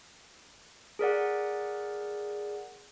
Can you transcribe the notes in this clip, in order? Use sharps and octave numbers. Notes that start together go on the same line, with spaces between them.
G#4 A#4 D5 F#5